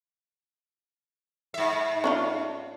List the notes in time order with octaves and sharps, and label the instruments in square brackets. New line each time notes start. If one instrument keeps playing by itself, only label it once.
[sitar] G#2 E5
[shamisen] C#4 D4 F4